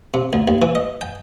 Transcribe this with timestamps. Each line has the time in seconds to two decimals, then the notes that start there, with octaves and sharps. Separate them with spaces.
0.14 C3
0.33 D2
0.48 D#2
0.62 E3
0.75 D#5
1.01 G5